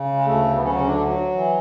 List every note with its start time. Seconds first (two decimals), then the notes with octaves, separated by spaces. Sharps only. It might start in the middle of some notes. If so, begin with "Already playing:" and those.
Already playing: C#3
0.15 G#3
0.25 D2 A3
0.55 B3
0.62 C#3 F#3 C#4
0.75 C#4
0.86 D3 D4
0.98 F#3
1.34 E3